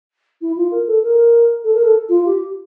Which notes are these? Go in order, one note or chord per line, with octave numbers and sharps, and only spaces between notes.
E4
F4
A#4
A4
A#4
A4
A#4
A4
F4
G4